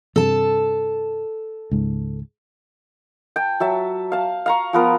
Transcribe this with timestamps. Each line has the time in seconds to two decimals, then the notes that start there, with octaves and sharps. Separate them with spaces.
0.16 G2 C3 A4 A5
1.71 C#2 G#2
3.36 G5 A5
3.60 F#3 E5 A5
4.12 F5 A5
4.46 F5 A#5 C#6
4.73 F3 B3 A#4